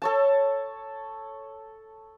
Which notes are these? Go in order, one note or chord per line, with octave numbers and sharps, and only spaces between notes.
A4 C#5 A5